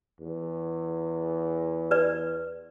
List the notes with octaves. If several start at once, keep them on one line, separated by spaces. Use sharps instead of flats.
E2
B4 D5